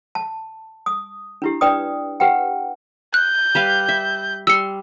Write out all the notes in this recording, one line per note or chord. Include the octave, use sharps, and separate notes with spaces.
A5
D#6
D4 E4 G4
D4 B4 D5 G5 D#6
G4 B4 F#5 G5
F#6 G6
G3 B4 F5
E5
G3 C6 E6 C#7